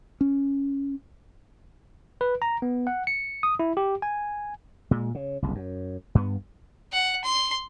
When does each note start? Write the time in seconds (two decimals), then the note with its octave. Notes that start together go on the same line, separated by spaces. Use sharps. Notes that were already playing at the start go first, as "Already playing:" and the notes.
0.21 C#4
2.21 B4
2.42 A#5
2.62 B3
2.87 F#5
3.07 C#7
3.43 D#6
3.59 E4
3.77 G4
4.02 G#5
4.91 A#2 G#3
5.15 C#3
5.42 F#1 C2
5.55 F#2
6.15 G2 B3
6.93 F#5
7.24 C6